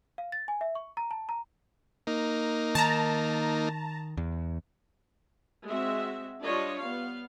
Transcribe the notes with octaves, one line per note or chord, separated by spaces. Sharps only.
F5
A6
G#5
E5
C#6
A#5
A5
A#5
A#3 D#4
D#3 A5 A#5
E2
G#3 C4 F#4 E5
G3 D4 F4 C#5 D#5
B3 F5